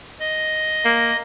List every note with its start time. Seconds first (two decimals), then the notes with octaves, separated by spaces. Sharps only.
0.20 D#5
0.85 A#3